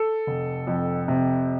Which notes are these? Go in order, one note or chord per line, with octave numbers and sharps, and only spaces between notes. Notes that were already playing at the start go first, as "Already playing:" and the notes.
Already playing: A4
F1
F2
C3